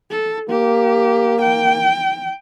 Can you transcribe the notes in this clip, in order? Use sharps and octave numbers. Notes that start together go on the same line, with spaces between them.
A4
A#3 G4
G5